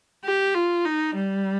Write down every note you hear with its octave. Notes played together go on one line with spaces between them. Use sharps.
G4
F4
D#4
G3